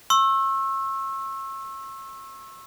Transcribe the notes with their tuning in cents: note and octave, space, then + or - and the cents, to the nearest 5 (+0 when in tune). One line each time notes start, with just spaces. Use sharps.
C#6 -40 E6 +0